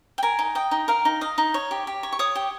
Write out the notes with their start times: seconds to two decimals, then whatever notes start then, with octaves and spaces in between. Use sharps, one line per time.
0.18 G5
0.23 A#4 G#5
0.39 D#4
0.55 D#5 G5
0.71 D#4
0.88 A#4 F5
1.05 D#4
1.21 D#5 F5
1.38 D#4
1.54 C#5
1.71 G4
1.87 G4
2.03 C#5
2.13 C#6
2.19 C#5 D#6
2.35 G4